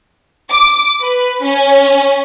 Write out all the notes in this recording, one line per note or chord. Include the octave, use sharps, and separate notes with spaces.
D6
B4
C#4